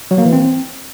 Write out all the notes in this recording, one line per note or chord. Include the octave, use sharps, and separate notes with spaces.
F#3
A#3
E3
C4